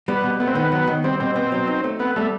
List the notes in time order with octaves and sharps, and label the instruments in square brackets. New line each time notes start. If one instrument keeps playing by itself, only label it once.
[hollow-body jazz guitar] G3 [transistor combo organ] B3
[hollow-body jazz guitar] B2
[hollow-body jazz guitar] A3 [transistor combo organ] B3
[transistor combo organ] C4
[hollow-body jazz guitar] D#3 [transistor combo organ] B3
[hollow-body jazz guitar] F#3
D#3
[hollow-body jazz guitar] G3 [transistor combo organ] C4
[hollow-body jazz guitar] B2 [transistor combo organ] C4
[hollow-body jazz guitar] B3 [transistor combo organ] C4
[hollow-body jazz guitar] F#3
D#4
A3
[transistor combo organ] B3 [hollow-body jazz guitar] C4
[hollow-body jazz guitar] G3 [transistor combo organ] A3